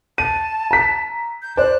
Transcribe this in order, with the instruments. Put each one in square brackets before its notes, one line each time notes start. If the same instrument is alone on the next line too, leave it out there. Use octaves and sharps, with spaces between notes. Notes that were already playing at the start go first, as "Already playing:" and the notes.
[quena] A5 [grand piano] D#7
[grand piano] A#5 B6
[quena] G6
[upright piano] C5 D5 [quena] F#6